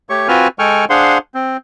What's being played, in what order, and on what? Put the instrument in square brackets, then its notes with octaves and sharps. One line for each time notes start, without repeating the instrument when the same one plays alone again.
[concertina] A3 G4 C#5 C#6
C4 F4 F#4 B4 G#5 F6
G#3 A4 G5 G#5 C#6 F6
D4 G#4 C5 F5 F#5 C6
C4